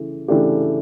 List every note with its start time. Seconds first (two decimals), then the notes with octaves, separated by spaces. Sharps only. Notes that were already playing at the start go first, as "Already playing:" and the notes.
Already playing: C#3 E3 A3
0.28 C#3 E3 A3 D4 G4